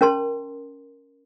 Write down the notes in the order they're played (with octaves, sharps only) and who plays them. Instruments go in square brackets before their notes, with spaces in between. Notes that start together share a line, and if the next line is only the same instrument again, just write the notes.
[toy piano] C#4 A#4 A5 C6